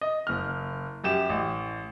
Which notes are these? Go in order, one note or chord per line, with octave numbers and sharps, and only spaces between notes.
D#5
F#1 F6
F#2 G4 E7
A1